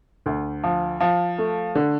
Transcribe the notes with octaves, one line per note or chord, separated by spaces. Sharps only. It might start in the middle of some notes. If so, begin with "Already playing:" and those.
D2
F3
F3
A3
D3